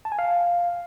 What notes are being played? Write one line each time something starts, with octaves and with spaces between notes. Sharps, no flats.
A5
G#5
F5